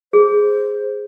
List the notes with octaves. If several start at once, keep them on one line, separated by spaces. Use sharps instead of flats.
G#4 C5